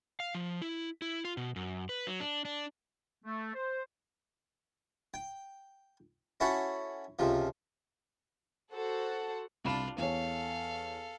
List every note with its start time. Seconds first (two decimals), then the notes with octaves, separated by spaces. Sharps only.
0.20 F5
0.35 F3
0.62 E4
1.02 E4
1.25 F4
1.37 B2
1.56 F#2
1.89 B4
2.07 F#3
2.20 D4
2.45 D4
3.24 A3
3.55 C5
5.14 G5
6.40 C#4 E4 F#4 A4 F#5
7.19 C#2 C3 F3
8.72 F#4 A4 C5 F#5
9.64 C2 D4 F4 B5 E7
9.98 E2 A4 C#5 F5